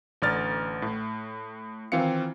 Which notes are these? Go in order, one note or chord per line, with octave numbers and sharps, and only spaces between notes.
A1 D3 D5 F6 A6
A2
D#3 E3 C4 F4 F5 C#7